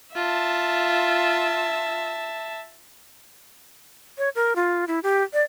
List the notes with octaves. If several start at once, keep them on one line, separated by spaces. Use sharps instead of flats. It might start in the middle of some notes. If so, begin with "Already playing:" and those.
F4 E5 A5
C#5
A#4
F4
E4
G4
D5